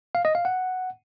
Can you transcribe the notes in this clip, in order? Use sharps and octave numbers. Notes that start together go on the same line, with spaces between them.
F5
D#5
F5
F#5